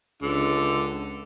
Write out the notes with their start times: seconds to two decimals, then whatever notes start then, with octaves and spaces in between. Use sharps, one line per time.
0.22 C#2 D3